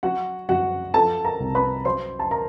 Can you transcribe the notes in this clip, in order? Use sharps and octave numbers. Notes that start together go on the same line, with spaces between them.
F#3 F#4 F#5
F#2 F#4 F#5
F3 A4 A5
A#4 A#5
C2
B4 B5
F#3 C5 C6
A5
A#4 A#5